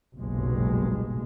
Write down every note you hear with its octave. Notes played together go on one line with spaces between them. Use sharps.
F#1 B1 G2 A#2 G#3